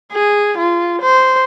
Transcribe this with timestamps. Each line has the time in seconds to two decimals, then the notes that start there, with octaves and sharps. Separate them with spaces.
0.13 G#4
0.58 F4
1.02 C5